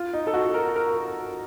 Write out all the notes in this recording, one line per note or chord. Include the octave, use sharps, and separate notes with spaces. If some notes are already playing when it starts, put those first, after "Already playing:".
Already playing: F4
D#4
A4
F#4
A#4
A#4